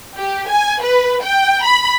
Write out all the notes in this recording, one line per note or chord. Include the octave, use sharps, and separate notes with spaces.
G4
G#5
B4
G5
B5